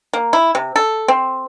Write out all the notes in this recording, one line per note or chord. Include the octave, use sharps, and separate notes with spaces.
A#3
E4
C3
A4
C4